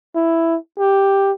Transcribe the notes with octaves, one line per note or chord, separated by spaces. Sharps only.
E4
G4